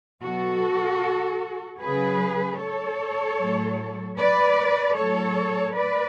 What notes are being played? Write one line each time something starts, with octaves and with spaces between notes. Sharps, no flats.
B2 F#3 F#4 A4
C#3 F#3 G#4 B4
A4 C#5
A2 F#3
B4 D5
A2 F#3 A4 C#5
B4 D5